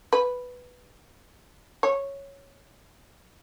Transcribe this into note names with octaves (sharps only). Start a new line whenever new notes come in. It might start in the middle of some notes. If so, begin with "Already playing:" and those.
B4
C#5